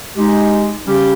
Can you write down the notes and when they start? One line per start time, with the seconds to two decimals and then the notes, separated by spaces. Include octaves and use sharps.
0.16 G#3 D#4 G4
0.86 C#3 G3 C#4 G4